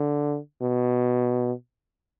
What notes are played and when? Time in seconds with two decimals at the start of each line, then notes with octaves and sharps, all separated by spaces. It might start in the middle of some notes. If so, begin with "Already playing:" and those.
Already playing: D3
0.62 B2